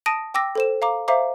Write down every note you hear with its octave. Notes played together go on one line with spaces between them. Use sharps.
A5 D#6 A#6 D7 D#7
G5 D6 E6 A#6
A4 C5 E7
F5 A#5 D6
C5 E5 F5 A#5 D6